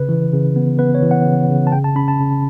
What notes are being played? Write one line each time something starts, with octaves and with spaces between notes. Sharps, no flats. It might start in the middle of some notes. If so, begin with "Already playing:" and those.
Already playing: C#3 B4
E3
C#3
B3
B3 B4
C#5
E3
F#5
C#3
C#3
A5
C#3 G5
A5
C#4 B5
A5
C#3